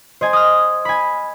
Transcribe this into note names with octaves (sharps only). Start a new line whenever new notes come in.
C5 D#5 G#5
D#6 F6
G#5 B5